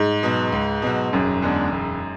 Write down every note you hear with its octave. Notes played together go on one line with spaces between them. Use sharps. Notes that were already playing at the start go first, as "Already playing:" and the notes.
Already playing: G#2
B2 F#3
C#2
B2 F#3
E1 F#2
E2 D3 G#3 D4
E1